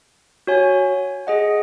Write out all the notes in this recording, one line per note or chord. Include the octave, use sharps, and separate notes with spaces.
F#4 C#5 G#5
G#4 D#5 F#5